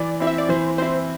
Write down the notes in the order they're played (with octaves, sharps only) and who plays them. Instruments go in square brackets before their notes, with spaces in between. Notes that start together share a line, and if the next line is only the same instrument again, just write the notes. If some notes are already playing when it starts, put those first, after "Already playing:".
Already playing: [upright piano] E3 [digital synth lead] D5
[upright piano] C4 E4
[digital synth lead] E5
D5
[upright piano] E3 [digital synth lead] C5
[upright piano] C4 E4 [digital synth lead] C5